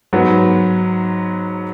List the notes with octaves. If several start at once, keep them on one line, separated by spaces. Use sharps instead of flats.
G#2 F#3 B3